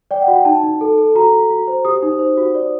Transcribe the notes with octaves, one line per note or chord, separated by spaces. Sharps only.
D5 G5
F#5
F#4
G5
D#4 A5
D#4
A4
A4
F#4 A#5
F#4
F#4
C5
G4 D#6
D#4
C5
F#4
D5